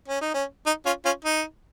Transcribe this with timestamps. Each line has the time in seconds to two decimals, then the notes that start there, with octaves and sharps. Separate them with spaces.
0.08 C#4
0.21 D#4
0.34 C#4
0.66 D#4
0.86 C#4 F4
1.05 C#4 F4
1.25 D#4